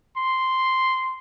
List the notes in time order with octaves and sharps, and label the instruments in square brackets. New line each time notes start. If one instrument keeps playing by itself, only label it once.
[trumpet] C6